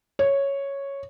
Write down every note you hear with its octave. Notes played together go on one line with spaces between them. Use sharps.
C#5